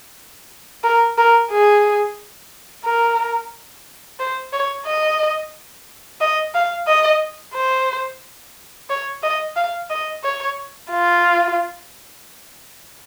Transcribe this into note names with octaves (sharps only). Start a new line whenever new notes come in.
A#4
A#4
G#4
A#4
C5
C#5
D#5
D#5
F5
D#5
C5
C#5
D#5
F5
D#5
C#5
F4